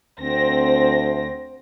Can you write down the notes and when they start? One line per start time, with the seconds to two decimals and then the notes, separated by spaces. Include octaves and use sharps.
0.21 D2 C4 A#6